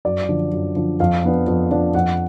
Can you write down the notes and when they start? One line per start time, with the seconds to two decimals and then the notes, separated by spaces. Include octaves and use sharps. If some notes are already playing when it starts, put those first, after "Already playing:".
0.05 F#2 D5
0.29 D3 F3
0.53 F#2
0.76 D3 F3
1.00 F2 F5
1.24 F3 B3 D4
1.47 F2
1.71 F3 B3 D4
1.95 F2 F#5